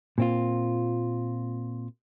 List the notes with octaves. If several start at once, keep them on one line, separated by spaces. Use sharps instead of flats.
A#2 C4 F4